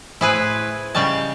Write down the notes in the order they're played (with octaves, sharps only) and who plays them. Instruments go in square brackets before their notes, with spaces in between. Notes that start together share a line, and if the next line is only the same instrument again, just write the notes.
[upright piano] A2 C5 D#7 [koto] E4 G#4 B4
[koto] C#3 G3 A5 [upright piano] D#5 G5 C#6